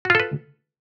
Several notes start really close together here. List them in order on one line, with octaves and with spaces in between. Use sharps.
F#4 F4 A4 B4